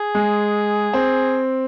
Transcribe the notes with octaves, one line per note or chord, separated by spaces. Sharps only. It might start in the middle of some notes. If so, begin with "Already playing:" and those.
Already playing: G#4
G#3
C4